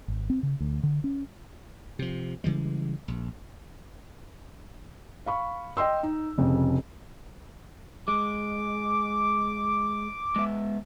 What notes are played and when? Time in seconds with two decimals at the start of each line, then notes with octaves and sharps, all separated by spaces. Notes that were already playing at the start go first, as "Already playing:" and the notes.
0.08 G#1
0.30 C4
0.43 C#3
0.60 D2
0.83 D3
1.04 C#4
1.99 C3 F3
2.44 C#3 E3 G3 G#3
3.08 A#1
5.26 F5 B5 C#6
5.77 D#5 G5 C6 E6
6.03 D#4
6.38 F1 F2 C#3
8.08 G#3 D6
10.36 G#3 B3 E5